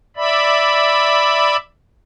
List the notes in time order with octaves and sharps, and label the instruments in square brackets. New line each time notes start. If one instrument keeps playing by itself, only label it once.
[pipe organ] D5 E5 B5